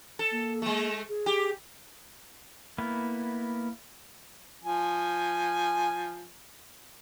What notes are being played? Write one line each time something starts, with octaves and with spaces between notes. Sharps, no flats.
A4
A#3
G#3 A3
G#4
G4
A#3 B3 E4
F3 G#5